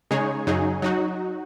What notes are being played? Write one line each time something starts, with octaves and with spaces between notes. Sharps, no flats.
C#3 G#3 D#4 G#4 C#5
F#2 C#3 F#3 D#4 G#4
F#3 D#4 F#4